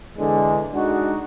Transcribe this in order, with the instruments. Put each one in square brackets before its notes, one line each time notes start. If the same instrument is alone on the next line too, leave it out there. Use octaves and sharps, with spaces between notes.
[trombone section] E2 D3 G#3
G#3 D4 D#4 F#4